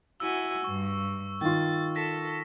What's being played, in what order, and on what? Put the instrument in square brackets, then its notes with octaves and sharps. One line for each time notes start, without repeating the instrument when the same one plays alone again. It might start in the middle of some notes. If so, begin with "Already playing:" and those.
[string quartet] E4 F#4 G#5 [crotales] E6
[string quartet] G2 [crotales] C#6
[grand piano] D#3 F4 [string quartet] A6
[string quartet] A4 [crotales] A#6 B6